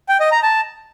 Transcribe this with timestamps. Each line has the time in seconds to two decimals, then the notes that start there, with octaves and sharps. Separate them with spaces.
0.09 G5
0.20 D#5
0.32 A#5
0.43 A5